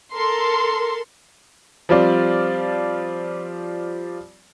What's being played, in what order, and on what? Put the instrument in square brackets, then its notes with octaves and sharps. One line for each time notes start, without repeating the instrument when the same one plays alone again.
[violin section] A4 A#4 C6
[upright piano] F3 G3 C4 F4 D5